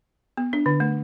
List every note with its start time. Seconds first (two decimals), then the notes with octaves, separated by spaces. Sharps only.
0.37 B3
0.53 D4
0.66 D3
0.80 A3